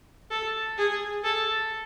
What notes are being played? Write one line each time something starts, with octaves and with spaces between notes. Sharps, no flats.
A4
G#4
A4